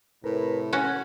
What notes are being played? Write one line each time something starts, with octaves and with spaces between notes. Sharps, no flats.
A2 C3 A#4 B4
C#4 F#4 F#5 G#5